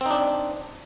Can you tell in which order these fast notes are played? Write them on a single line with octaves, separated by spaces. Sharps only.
C4 D#4 D4